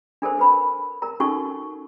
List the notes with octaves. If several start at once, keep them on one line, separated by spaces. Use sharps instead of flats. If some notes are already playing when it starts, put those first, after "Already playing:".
D4 A4 A#4 C5
A4 B4 B5
A#4 A#5
C#4 D#4 F#4 A4 C#6